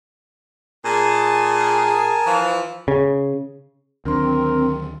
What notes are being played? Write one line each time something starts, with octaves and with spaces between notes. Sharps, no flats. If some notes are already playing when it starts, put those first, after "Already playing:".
A#2 G#4 A#4 G#5 A5
E3 F3
C#3
D2 D#3 F#3 C4 D4 A#4 C6